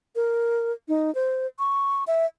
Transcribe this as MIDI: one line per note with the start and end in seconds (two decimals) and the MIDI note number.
0.16 0.72 70
0.88 1.13 63
1.15 1.47 72
1.59 2.04 85
2.07 2.26 76